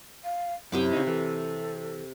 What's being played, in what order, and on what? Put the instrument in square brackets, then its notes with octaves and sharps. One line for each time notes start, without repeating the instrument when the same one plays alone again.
[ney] F5
[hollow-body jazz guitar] F#2 [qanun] C3 G5 D6 [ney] E4
[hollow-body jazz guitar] C#3 D#4
[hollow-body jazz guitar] E3 [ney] A4